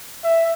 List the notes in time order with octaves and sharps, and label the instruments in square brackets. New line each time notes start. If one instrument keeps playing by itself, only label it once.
[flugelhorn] E5